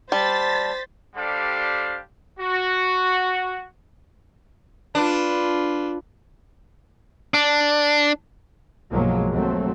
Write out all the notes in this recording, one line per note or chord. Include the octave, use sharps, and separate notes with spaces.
G3 C5 A5 A6 B6
G3 D4 G4 A4 C5 F5
F#4
D4 F4 B4
D4
B1 G2 F3 F#3 G#3 A#3
D#2 F#3 A3 C4